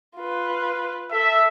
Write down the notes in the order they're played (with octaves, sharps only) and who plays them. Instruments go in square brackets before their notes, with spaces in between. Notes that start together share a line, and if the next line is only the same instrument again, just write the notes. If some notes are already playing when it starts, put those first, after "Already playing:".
[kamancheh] F4 B4
[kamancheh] A4 [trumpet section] E5